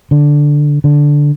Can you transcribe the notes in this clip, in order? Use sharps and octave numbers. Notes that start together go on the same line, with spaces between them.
D3
D3